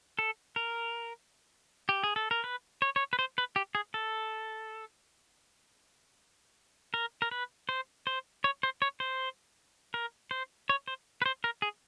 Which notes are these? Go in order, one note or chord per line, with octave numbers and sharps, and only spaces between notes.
A4
A#4
G4
G#4
A4
A#4
B4
C#5
C#5
B4
C5
B4
G4
G#4
A4
A#4
A#4
B4
C5
C5
C#5
C5
C#5
C5
A#4
C5
C#5
C5
B4
C5
A#4
G#4